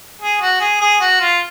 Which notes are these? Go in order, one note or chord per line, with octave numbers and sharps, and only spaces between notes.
G#4
F#4
G#4
G#4
F#4
F4